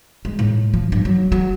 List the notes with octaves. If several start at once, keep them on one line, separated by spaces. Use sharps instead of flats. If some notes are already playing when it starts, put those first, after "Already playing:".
G#3
A2
F3
G2
F#3
F#3